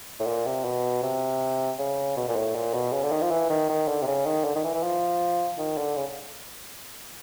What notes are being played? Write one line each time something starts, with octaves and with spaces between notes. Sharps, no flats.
A2
A#2
C3
B2
C3
C#3
B2
A#2
A2
A#2
B2
C#3
D3
D#3
F3
E3
D#3
D#3
D3
C3
C#3
D#3
D3
D#3
E3
E3
F3
D#3
D3
C#3